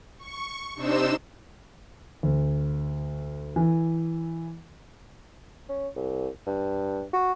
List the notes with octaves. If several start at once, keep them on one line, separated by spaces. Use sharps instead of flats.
C#6
C3 D4 D#4 C5 E6 E7
D2
E3
C#4
C2
G2
F#4